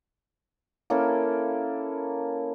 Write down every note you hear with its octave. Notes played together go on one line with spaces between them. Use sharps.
A#3 C#4 E4 A4